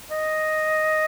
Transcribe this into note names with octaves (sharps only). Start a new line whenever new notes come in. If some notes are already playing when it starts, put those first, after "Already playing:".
D#5